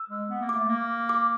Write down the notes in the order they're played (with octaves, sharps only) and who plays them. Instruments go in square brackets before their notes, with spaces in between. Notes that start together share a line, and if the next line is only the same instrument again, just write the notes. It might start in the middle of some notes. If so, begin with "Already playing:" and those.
Already playing: [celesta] E6
[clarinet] G#3
B3
A#3
[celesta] D6
[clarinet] A3
A#3
[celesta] D6